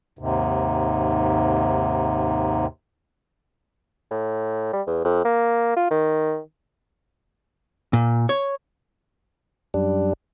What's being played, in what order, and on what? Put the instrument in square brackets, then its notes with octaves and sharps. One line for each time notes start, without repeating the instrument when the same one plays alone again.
[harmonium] D#2 G#2 C3
[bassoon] A2
G3
E2
F2
A#3
F4
D#3
[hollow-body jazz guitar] A#2
C#5
[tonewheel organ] F#2 G3 D4